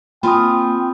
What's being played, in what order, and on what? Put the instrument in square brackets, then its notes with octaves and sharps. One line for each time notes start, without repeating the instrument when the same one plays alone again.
[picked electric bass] A#3 [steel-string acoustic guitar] C4 F4 G#5 [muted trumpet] G5 [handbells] B5 C6 D#6